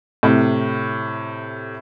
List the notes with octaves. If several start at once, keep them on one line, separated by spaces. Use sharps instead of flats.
A2 C3